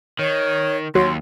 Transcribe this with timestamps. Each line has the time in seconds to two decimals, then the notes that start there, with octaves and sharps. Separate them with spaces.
0.19 D#3 C#5
0.95 D#2 F#3 C6